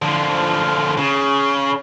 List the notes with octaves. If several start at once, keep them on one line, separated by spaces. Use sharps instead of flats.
D3 F3
C#3